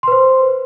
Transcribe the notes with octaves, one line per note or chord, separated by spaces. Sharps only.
B4 C5 C6